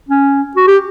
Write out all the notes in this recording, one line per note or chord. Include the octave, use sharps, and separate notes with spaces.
C#4
F#4
G4